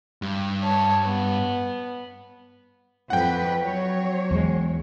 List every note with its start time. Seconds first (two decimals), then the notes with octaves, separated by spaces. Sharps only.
0.22 G2
0.63 C#5 A5
1.05 B3
3.10 F2 B4 F#5 G5
3.62 F#3 C#5
4.31 E2 G#3